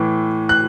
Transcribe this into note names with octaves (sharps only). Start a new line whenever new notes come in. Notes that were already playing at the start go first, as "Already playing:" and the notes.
Already playing: A2 E3
F#6